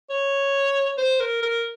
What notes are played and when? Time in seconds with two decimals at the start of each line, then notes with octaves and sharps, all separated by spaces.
0.10 C#5
0.98 C5
1.20 A#4
1.42 A#4